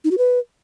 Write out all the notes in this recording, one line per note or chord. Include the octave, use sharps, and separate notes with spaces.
D#4
F#4
B4